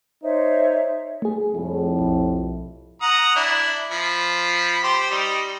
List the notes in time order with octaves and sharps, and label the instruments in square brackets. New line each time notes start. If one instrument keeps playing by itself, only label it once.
[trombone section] D#4 [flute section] C5 C#5 E5
[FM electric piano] A3 G#4
[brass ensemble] C2 F2 A2
[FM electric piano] B1
[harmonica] F#5 A#5 D#6
D4 E4
F3 B5
G4 C5
G3 D#4